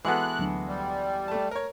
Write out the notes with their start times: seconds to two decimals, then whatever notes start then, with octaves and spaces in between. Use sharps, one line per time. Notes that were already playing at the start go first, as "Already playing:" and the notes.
0.05 E3 G#3 B3 F#4 A4 F#6
0.39 D2 F#3 D4
0.68 G3
1.28 A3 A5
1.51 A#4 C#5